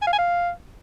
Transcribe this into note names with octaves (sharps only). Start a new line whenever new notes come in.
G#5
F5
G#5
F5